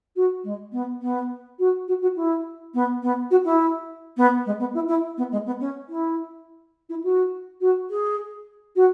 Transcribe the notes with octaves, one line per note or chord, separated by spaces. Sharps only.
F#4
G#3
B3
B3
F#4
F#4
F#4
E4
B3
B3
F#4
E4
B3
G#3
B3
E4
E4
B3
G#3
B3
C#4
E4
E4
F#4
F#4
G#4
F#4